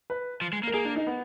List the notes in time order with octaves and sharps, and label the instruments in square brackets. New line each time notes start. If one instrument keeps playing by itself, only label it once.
[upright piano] B4
[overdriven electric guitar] F3
G#3
A#3
[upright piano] A#4
[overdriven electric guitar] A#3 [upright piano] G#4
[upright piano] D4
D#4
B3